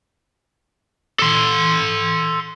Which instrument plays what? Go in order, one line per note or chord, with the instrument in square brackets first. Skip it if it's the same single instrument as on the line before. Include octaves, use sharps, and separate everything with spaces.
[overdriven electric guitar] A4 C6